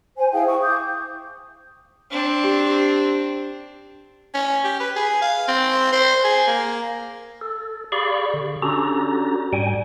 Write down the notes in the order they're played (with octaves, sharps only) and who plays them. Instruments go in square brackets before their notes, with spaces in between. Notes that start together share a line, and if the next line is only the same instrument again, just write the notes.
[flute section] C5 G#5
E4 G#4 F5 G5
C#6 D#6
D6 D#6 G6
[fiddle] C4 D4
[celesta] G4
[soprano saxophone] C#4
G4
B4
G#4
F5
C4
C5
G#4
A#3
[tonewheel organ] A4
G4 G#4 D5 F5 B5 C#6
D3
C#4 D4 F#4 G4 A4 A#5
G#2 G3 G5 G#5